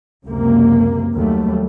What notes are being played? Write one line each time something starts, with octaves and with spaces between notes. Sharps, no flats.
C#2 F#2 C3 A#3
D#2 F#3 G3 A3